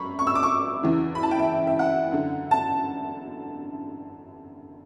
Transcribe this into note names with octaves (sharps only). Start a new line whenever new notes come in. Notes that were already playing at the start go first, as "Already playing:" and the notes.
Already playing: F#2 B5 C#6
C#6
E6
D6
C#6
E2 C#3 E3
B5
A5
G5
E5
E5
F#5
F#2 D3
A5